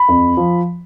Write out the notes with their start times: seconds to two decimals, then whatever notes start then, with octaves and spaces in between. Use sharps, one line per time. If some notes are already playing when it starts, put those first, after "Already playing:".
Already playing: B5
0.08 F2
0.37 F3